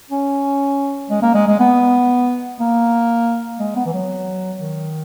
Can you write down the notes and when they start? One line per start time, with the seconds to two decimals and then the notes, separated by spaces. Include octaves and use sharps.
0.10 C#4
1.10 G#3
1.22 A#3
1.35 G#3
1.47 G#3
1.60 B3
2.60 A#3
3.60 G#3
3.76 B3
3.86 E3
3.93 F#3
4.60 D#3